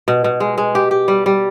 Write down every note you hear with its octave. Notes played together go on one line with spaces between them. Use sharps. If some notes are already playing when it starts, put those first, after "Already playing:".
B2
B2
G#3
G#3
G4
G4
G3
G3